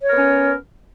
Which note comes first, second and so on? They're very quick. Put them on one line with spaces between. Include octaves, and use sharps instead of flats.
C#5 A#4 B3 C#4